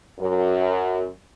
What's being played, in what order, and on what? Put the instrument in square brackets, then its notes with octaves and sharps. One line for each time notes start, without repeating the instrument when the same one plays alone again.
[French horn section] F#2